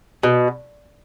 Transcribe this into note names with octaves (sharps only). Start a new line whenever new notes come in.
B2